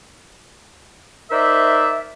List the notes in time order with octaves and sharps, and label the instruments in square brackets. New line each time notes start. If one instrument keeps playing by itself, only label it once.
[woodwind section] D#4 A#4 C5 D5 E5